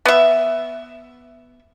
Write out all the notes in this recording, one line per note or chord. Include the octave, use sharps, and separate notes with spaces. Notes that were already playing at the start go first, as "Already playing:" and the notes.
B3 E5